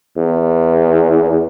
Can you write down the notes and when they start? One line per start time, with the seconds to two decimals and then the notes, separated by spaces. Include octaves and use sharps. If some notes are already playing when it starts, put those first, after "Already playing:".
0.17 E2